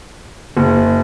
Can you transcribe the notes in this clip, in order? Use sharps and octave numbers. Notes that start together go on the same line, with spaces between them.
F#1